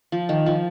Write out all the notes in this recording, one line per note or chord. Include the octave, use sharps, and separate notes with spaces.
F3
D#3
F3